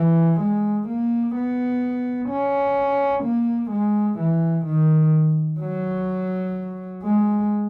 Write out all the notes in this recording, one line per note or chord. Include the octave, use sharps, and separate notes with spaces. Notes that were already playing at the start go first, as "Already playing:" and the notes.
Already playing: E3
G#3
A#3
B3
C#4
A#3
G#3
E3
D#3
F#3
G#3